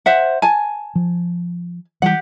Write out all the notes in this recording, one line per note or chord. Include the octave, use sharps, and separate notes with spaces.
C5 E5 F#5
G#5 A5
F3
E3 G3 G4 F#5